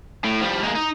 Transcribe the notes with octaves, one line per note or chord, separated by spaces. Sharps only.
A2
F3 G3
G#3 A#3
D#4